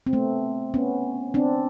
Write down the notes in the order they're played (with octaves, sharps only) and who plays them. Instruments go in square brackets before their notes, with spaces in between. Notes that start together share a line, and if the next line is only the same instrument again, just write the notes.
[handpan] C4
A3 B3
B3 C#4
C4 D4